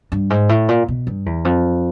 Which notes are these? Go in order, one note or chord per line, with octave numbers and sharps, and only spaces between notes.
G2
G#2
A2
A#2
B2
G2
E2
F2